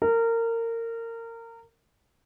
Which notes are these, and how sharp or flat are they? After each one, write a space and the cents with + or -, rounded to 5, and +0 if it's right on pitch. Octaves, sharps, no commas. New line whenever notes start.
A#4 -25